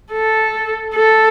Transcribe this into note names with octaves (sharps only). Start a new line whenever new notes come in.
A4
A4